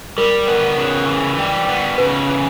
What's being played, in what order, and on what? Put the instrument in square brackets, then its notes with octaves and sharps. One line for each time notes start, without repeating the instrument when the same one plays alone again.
[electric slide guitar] G3 [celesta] A#4
[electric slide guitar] B3 [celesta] A#4
[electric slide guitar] C#3
E3
G3
B3
[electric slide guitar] C#3 [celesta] B4
[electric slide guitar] E3